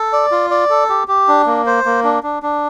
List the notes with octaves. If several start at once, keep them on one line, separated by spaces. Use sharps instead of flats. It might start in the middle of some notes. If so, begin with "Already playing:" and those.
Already playing: A4
D5
F4
D5
A4
G4
G4
D4
A#3
C5
A#3
D4
D4
D4